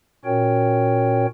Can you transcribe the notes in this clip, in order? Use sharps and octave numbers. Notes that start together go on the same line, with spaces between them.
A#2 C#4 F#4 A#4 C#5 G5